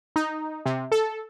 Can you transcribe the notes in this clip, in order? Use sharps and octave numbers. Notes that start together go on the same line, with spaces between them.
D#4
C3
A4